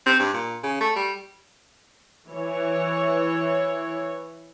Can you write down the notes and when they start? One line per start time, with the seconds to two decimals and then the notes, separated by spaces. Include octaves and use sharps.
0.06 C4
0.19 G2
0.34 A#2
0.63 C#3
0.81 A3
0.96 G3
2.29 E3 C#5